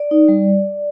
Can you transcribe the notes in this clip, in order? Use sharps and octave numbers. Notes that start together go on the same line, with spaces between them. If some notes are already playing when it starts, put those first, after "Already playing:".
Already playing: D5
D#4
G3